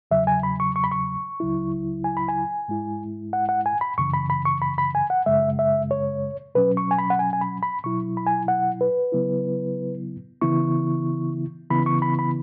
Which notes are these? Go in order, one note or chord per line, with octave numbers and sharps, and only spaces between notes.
E2 C#3 F#3 E5
G#5
B5
C#6
C#6
B5
C#6
C#2 C#3 F#3 E4
G#5
B5
G#5
G#2 G#3 E4
F#5
F#5
G#5
B5
F#2 C#3 E3 C#6
B5
B5
C#6
B5
B5
G#5
F#5
F#2 C#3 G#3 E5
E5
C#5
B2 F#3 C#4 B4
C#6
G#5
B5
F#5
G#5
G#5
B5
B5
B2 F#3 E4 C#6
B5
G#5
F#5
B4
C#3 F#3 B3 E4
C#3 E3 B3 E4 C#6
C#3 E3 B3 E4 B5
C#6
B5
B5